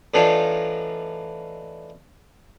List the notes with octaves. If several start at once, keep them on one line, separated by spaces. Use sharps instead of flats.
A2 E3 D4 D#4 F4